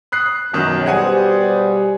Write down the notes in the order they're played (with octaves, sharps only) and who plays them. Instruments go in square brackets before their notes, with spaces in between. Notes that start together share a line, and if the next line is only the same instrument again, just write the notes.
[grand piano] D#6 F#6 C7
[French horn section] F#2 [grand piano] B2 D#3
[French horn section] B2 G3 C5 [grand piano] G#4 F#5 G#5